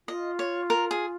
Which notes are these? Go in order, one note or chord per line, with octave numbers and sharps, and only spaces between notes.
F4 D#5
C#5
A#4
G#4